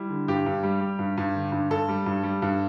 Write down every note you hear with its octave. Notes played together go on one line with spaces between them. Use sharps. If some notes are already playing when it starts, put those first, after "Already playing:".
Already playing: G3 E4
D3
G2 G4
G2
G3
G3
G2
G2
D3
G2
G2 A4
G3
G2
G3
G2